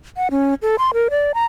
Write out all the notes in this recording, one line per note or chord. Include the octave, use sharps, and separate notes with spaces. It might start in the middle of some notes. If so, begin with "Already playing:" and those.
F#5
C#4
A4
C6
A#4
D5
A#5